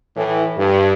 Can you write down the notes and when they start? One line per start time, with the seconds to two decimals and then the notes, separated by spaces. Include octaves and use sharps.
0.17 A2 E3
0.57 G2